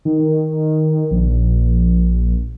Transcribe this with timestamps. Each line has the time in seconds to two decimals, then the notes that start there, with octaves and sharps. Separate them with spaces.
0.05 D#3
1.11 A#1